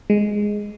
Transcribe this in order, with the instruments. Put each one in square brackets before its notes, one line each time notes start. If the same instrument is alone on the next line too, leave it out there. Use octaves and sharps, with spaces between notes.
[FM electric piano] G#3